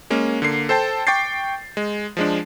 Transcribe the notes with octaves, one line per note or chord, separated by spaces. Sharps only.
G#3 A#3 C#4
D3 A#3 C7
A4 C5 G5 A5
G5 C#6 D6 G6 A6 C7
G#3
F3 G#3 D4